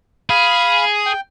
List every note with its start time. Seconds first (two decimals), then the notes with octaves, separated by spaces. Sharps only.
0.30 G#4 F5 B5
1.06 G5